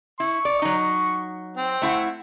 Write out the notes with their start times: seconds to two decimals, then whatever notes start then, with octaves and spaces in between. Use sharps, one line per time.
0.20 E4 C#6
0.45 D5
0.62 F#3 D#4
1.57 C4
1.82 A3 E4 F#5